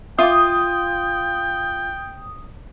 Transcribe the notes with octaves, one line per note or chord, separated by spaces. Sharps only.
F4 E5 F5 G5 D6 D#6